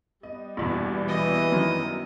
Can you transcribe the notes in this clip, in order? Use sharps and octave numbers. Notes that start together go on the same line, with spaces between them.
G3 B3 D#5
A#1 E2 B2
E3 D#5
F#2 D#3 F#3